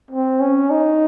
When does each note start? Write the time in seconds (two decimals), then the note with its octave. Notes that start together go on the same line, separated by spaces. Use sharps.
0.11 C4
0.40 C#4
0.70 D#4